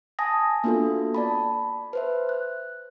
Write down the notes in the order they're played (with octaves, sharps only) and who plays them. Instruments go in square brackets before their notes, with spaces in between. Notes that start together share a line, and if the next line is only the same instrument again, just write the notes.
[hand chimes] G#5 A5 D#6 A#6
A#3 B3 D4 F4 F#4 A4
D5 A5 B5
B4 C5 E5
F#6